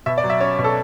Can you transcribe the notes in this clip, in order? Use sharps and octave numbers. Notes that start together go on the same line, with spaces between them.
B2 E5
D5
F#3
E5
C#4 C#5
B2
A4